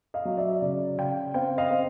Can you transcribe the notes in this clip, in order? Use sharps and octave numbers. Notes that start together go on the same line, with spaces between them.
D#5 F5
F#3
D5 E5
C#3 D5
C#3 F5 G5
C4 F5 G5
D#5 F5
C4